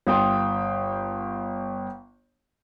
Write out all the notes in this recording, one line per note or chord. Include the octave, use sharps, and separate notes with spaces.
G1 F5 G5 C6 D#6